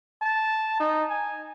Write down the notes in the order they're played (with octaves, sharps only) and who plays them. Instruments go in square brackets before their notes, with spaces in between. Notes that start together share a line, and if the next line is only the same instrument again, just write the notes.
[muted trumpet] A5
D#4
G#5